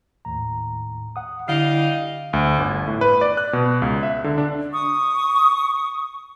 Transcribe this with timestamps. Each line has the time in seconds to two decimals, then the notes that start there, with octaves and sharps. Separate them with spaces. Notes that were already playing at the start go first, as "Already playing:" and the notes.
0.25 D#2 A2 A#5
1.16 F#5 D#6
1.49 D3 G3 E4 D#5 F5
2.33 D2
2.58 G1
2.88 A2
3.01 B4
3.21 D5
3.37 F#6
3.53 B2
3.82 C#2
4.03 E5
4.24 D3
4.38 D4
4.73 C#6 D#6